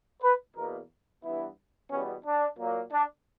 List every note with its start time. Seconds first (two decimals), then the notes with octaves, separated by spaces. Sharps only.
0.23 B4
0.56 E2 B2 A#3 A#4
1.24 G2 E3 B3 E4
1.91 E2 B2 G3 B3 C#4
2.25 D4
2.58 A#2 F#3 A#3
2.92 D4